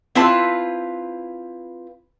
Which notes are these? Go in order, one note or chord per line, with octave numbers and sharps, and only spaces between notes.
C4 E4 F4 B4 A5